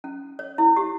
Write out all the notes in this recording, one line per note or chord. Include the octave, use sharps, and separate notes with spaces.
C#4
C#5
E4
G4